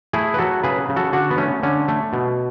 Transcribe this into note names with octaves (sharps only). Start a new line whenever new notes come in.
A3 E4 G#4
B4
F#3 F#4 A4
C#3 G#4 B4
C#3
F#4 A4
D3 D4 F#4
B3
A3 C#4
D3 C#4
A3
B2